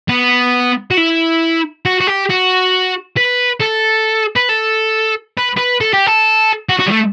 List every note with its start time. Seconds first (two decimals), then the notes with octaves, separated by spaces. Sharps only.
0.09 B3
0.91 F#4
0.97 E4
1.85 F#4
2.00 F#4
2.07 G4
2.30 F#4
3.17 B4
3.61 A4
4.36 B4
4.49 A4
5.38 B4
5.57 B4
5.81 A4
5.94 G4
6.07 A4
6.69 F#4
6.79 F#4
6.87 G3
6.91 A3